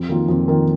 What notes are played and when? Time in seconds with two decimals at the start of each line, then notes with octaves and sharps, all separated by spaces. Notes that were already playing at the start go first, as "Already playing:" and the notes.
Already playing: F2
0.09 D#3 A#3 F4
0.29 F2
0.48 D#3 A#3 F4